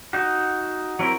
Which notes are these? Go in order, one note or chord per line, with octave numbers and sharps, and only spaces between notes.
D#4 F#4
F#3 C4 E4 A#4